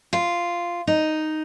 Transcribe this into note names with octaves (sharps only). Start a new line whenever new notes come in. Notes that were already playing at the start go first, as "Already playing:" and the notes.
F4
D#4